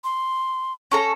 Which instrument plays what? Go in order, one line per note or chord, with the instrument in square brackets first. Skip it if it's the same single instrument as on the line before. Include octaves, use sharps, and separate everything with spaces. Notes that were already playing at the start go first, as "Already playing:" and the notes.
[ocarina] C6
[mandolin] C#4 A4 A#5